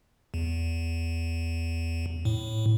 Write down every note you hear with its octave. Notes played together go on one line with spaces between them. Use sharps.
E2
A2